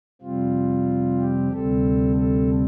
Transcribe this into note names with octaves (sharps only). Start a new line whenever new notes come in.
F2 C3 G3 C4 F4
G4
D2 C3 G3 C4 A4
A4